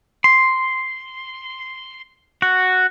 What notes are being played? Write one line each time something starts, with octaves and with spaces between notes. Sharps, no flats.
C6
F#4